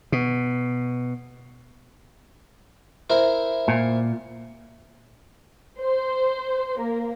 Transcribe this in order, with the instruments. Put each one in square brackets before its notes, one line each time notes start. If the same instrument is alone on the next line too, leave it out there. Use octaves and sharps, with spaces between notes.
[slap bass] B2
[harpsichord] E4 A#4 C5
[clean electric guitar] A#2
[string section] C5
A#3